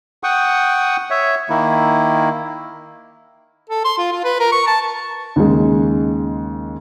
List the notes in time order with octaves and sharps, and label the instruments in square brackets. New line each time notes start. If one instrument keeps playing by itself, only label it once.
[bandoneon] F#5 G5 C#6 D#6
C#5 E5
D#3 A#3 E4
[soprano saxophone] A4
C6
F4
F4
B4
A#4
C#6
A5
[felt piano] D#2 C#3 G#3